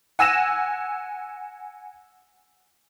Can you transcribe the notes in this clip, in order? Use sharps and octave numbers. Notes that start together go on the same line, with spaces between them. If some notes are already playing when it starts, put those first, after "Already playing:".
F#5 G#5 E6 A#6 D#7 E7